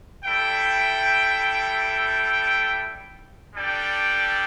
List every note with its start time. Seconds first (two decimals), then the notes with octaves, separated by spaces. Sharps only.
0.25 G3 E4 A4 E5 G5
3.55 G3 D4 A4 D5 G5